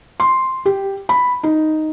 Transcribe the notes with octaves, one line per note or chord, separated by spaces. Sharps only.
C6
G4
B5
D#4